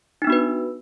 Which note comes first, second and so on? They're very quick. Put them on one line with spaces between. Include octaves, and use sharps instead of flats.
D#4 D4 B3 F#4 B4